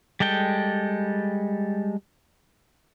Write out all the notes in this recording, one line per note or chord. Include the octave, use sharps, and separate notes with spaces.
G3 G#3 A4 G5